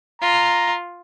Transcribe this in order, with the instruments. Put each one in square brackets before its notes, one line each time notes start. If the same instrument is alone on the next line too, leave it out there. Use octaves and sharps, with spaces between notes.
[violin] F4 [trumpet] A#5